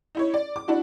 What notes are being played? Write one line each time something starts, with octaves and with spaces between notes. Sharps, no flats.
D#4 E4 C#5
D5
D6
D4 E4 F#4